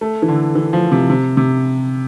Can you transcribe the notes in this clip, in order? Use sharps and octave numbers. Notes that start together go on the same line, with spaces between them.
A3
E3
D3
E3
F3
C3
C3
C3